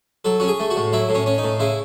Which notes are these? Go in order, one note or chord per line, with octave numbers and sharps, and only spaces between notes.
F#3 A4
C#4 F#4
G#4
A3
F#4
A2
F#3 E4
A2
C#4
C#4
D#4
A2
C#3 E4